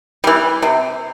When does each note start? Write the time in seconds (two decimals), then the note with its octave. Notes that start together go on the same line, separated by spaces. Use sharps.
0.24 E3 G3
0.62 C3